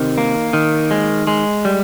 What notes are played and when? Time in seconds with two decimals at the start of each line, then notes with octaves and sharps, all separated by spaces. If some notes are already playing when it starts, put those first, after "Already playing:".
Already playing: C3 D#3
0.18 A#3
0.53 D#3
0.91 G#3
1.27 G#3
1.65 G3